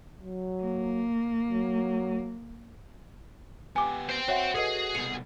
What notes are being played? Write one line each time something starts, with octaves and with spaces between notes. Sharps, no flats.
F#3
A#3
F#3
B3 G4 G#5 D6
C5 G5
F#4 C#5 E5 F#5
G#4 A4 B4 D#5
C2 B2 C#7 F7